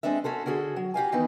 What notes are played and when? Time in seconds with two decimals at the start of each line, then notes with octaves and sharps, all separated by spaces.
0.03 G#3 C4 D4 A4 E5
0.24 C#4 F#4 A4 C5
0.46 D3 C#4 F#4 G#4 A4
0.76 F#3
0.94 F#4 G4 F5 G#5
1.12 D#3 E3 B3 D#4